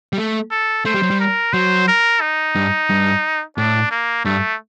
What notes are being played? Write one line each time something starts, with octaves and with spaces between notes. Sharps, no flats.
G3
A3
A4
A3 C5
G3
F#3
G3
A#4
F#3 C5
A#4
D#4
G2
G2
A2 D4
A#3
G2 A3